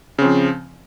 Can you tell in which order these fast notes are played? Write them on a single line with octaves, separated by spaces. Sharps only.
C#3 C4 F3